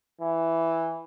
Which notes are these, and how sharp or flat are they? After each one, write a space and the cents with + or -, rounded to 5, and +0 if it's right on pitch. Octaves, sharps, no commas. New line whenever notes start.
E3 +0